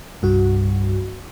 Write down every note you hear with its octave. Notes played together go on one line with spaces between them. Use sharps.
C2 G2 F#4